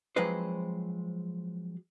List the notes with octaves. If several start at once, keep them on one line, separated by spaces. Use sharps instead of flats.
F3 F#3 G#3 C4 B4 C5